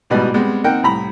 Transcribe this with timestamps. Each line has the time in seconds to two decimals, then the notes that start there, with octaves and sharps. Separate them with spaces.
0.10 A1 G#2 B2 G3 B4 D#5
0.34 G3 G#3 B3 C4
0.64 A#3 C4 D#4 A#4 F#5 G5
0.83 C2 A2 A#5 B5